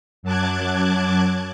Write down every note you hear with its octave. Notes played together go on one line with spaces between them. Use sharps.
F#2 F#3 A5 D6 F#6 G#6